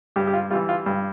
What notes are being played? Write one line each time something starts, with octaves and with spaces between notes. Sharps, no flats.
G2 G4
G4
F4
E3 G3 F4
F4
G2